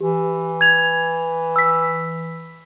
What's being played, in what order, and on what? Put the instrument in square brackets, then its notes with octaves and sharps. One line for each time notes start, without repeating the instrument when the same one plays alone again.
[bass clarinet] E3 [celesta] G4
[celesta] G#6 F7
E6 B6